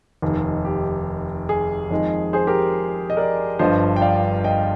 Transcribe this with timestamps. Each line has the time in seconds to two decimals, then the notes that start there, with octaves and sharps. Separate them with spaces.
0.22 F1 D#2 D#3
0.65 G4
1.49 G#4
1.91 F2 D#3 G#3
2.33 G#4 C5
2.47 G4 A#4
3.10 D#5
3.17 A#4 D5
3.59 G1 G2 D3 F3 C5 D#5
3.96 G5
4.01 D5 F5
4.44 D#5 G5